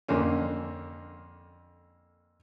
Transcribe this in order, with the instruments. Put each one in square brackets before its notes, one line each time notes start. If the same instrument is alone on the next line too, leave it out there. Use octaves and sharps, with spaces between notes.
[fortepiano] F2 D3 A#3 C#4